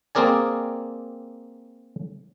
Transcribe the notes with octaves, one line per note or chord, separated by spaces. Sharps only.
A#3 C4 G#4 A#4 D5 G#5